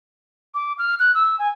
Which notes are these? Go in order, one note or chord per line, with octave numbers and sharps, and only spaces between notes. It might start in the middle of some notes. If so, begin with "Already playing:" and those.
D6
F6
F#6
E6
G#5